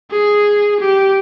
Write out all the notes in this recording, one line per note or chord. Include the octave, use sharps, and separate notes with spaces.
G#4
G4